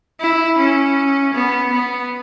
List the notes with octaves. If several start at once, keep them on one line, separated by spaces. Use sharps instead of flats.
E4
C#4
B3
B3